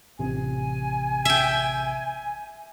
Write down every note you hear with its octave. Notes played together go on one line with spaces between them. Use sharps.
A1 C3 G#5
E5 G5